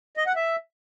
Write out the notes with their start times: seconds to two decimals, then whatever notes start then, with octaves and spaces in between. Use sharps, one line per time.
0.17 D#5
0.27 F#5
0.36 E5